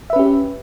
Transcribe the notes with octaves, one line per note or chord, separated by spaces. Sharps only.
C#4 G4 B4 E5